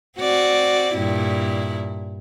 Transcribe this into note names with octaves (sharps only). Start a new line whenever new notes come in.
C4 F#4 D5
G2 A#2 E4